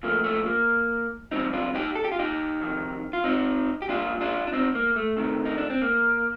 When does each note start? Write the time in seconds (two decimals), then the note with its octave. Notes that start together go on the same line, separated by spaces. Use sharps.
0.03 A#2 F3 A3 A#3
0.24 A3
0.46 A#3
1.31 F2 C3 G3 C4 D#4
1.53 D4 F4
1.75 D#4 G4
1.95 A4
2.05 G4
2.12 F4
2.19 D#4 G4
2.61 F2 C3 D#3
3.13 F4
3.24 C4 D#4
3.82 G4
3.89 A#2 G3 D4 F4
4.21 D4 F4
4.47 D4
4.53 C4 D#4
4.75 A#3
4.96 A3
5.17 C3 D#3 A3
5.45 D#4
5.58 D4
5.70 C4
5.82 A#3